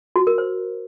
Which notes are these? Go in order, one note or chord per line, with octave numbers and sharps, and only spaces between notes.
F#4
A#4
C5